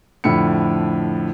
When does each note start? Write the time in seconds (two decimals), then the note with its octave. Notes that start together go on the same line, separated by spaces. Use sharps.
0.24 F2 A2 D3 B5 C#7